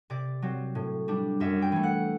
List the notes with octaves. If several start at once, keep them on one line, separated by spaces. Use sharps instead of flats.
C3 D5
F#3 C4
A2
G3 D4
F#2 E5
G5
E3 A3
F#5